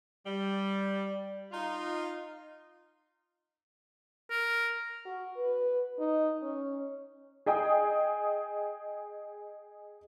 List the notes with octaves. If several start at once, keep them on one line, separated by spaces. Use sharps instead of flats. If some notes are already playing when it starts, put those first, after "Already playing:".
G3
D#4 F4
A#4
F#4
B4
D#4
C#4
G#4 D#5 G5 D#6